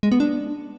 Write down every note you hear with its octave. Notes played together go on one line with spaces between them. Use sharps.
G#3
B3
D4